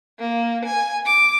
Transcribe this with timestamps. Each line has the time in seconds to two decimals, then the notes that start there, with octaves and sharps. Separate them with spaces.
0.20 A#3
0.65 G#5
1.06 D6